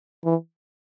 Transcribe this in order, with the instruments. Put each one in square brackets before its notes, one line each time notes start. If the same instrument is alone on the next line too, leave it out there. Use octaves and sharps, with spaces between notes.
[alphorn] E3